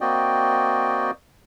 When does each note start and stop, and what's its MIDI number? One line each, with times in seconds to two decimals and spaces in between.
0.01 1.11 58
0.01 1.11 60
0.01 1.11 66
0.01 1.11 74
0.01 1.11 75
0.01 1.11 79